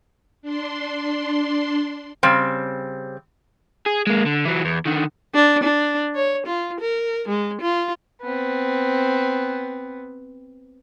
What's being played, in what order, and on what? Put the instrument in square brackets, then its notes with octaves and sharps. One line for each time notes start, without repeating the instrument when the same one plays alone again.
[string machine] D4 C6
[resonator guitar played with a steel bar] C#3 G3 C4
[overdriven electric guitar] G#4
G#3 A#3
D3
E3 F#3
E2
D3 D#3
[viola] D4
D4
C#5
F4
A#4
G#3
F4
[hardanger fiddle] B3 C4